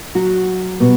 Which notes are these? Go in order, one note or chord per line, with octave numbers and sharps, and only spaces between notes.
F#3 F#4
B2 G3 B3